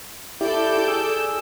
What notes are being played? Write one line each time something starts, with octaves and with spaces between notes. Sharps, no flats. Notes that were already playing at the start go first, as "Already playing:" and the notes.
E4 G4 A4 D5 G6
G#4 E6